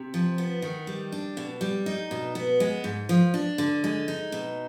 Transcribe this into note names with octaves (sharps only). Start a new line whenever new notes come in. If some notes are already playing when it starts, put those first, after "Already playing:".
Already playing: C3
F3
B3
D#3
G3
D4
B2
G3
D#4
B2
B3
G#3
G#2
F3
D4
D3
G#3
D#4
B2